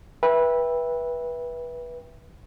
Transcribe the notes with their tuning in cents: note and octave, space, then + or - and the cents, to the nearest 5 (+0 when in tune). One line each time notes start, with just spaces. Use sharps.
B4 -20 E5 +0 G5 +20